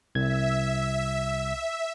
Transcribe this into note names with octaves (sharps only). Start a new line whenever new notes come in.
C2 E5 G#6